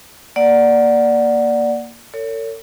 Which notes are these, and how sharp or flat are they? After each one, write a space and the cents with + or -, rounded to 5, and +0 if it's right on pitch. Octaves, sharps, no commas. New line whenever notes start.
A#3 +0 D5 +0 F#5 +0
A4 +45 C#5 +30